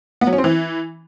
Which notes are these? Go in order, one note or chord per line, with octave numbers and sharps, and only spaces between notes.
B3
F#3
C#4
C4
E3